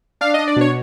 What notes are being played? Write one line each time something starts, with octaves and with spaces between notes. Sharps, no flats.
D4 F5
D#5
D4
D5
B2 C#5